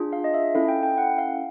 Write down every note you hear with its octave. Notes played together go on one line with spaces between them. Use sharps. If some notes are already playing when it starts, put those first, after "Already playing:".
Already playing: D4 F4 G#4
F5
D#5
E5
C#4 E4 A4 F5
G5
G5
F#5
F5